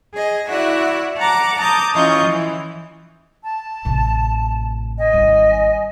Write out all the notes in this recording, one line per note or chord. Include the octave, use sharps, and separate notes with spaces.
G#4 D#5
E4 F#4 D5 E5 F#5
F#5 A5 A#5 D6
A5 A#5 D6 D#6 G6
E3 C#4 F4 D#5 C#6 G6
E3
A5
A1 C3
D#5 G#5
G#1 G3